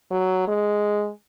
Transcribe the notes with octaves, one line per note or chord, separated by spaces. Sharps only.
F#3
G#3